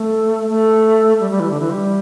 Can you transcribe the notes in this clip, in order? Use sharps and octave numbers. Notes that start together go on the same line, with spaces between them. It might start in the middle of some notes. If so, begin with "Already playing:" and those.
Already playing: A3
A3
G3
G3
E3
D3
E3
G3